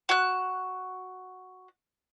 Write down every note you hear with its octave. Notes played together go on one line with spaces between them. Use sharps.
F#4 F#6